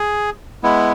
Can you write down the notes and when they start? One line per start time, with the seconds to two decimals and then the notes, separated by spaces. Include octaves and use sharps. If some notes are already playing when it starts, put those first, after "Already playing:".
Already playing: G#4
0.63 G#3 B3 E4